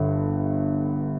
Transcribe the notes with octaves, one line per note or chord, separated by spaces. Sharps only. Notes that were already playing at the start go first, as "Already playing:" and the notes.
Already playing: G1 G2 D3